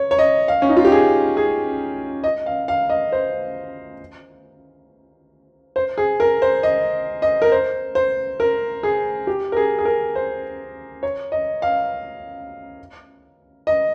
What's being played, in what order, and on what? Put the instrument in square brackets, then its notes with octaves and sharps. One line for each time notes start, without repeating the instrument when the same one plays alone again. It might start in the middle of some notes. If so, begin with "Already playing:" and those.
Already playing: [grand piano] C#5
C#5
D#5
F5
C#4
D#4
F4
G4
G#4
G#4
D#5
F5
F5
D#5
C5
C5
G#4
A#4
C5
D#5
D#5
A#4
C5
C5
A#4
G#4
G4
A#4
G#4
G#4
A#4
C5
C#5
D#5
F5
D#5